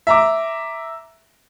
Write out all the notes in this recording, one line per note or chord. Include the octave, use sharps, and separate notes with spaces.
E5 A#5 D6